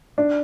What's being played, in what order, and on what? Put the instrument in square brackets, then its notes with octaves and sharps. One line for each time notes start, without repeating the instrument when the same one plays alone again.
[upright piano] D4